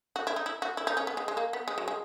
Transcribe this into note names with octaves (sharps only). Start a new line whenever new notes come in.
F#4
E4
D#4
E4
F#4
E4
D#4
C#4
B3
G#3
G#3
A#3
B3
G#3
F#3
G#3